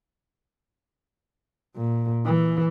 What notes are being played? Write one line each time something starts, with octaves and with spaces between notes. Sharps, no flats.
A#2
E3